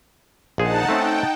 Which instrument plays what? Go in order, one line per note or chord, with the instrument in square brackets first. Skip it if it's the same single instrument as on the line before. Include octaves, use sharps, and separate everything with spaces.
[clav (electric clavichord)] A#1 G#4 C5 [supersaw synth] D#4 F#5 A5
[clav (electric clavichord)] A3 C4 C#4 [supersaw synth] G5